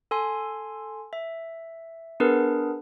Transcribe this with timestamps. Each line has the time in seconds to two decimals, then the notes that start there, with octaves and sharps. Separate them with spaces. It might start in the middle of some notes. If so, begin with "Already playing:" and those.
0.11 A4 G#5 C6
1.13 E5
2.20 B3 D4 G#4 A#4 B4